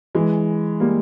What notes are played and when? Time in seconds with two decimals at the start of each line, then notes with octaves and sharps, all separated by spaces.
0.15 E3 G#3
0.80 G3 A#3